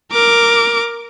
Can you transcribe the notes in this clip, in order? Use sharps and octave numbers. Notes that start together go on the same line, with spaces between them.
A#4 D6